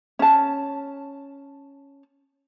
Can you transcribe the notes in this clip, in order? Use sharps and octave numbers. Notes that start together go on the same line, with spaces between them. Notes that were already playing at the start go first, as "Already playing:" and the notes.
C#4 A5